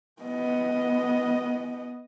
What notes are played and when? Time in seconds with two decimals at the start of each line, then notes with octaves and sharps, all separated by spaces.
0.22 B3 D#5